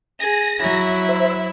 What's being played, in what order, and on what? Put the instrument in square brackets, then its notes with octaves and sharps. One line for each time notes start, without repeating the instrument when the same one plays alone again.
[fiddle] G#4 [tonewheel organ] A#6
[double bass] F#3 [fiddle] E4
[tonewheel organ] C5 E5